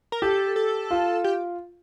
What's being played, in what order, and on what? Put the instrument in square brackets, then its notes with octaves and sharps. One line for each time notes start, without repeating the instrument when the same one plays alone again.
[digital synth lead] A#4
[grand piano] G4 [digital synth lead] A4
[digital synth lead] A4
[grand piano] F4
[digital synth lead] G4